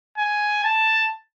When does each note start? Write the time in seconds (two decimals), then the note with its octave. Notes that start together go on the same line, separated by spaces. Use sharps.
0.18 G#5
0.64 A5